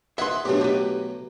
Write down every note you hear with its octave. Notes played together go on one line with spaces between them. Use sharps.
G#4 B4 E5 F#5 C6
B2 F#3 A3 D4 G4
G4 B4